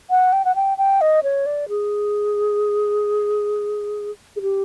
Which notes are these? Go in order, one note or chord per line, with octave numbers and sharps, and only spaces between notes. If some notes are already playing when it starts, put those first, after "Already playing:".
F#5
G5
F#5
G5
G5
D#5
C#5
D5
G#4
G#4
G4